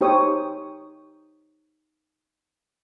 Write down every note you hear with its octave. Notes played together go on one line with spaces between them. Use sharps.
D#4 G4 C5 C#5 D#6